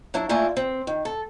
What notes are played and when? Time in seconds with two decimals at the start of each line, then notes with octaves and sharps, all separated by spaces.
0.14 F#3 D4 E4
0.29 A3 A#3 E4 F4 D5 G#5
0.57 C4
0.87 D#3
1.05 A4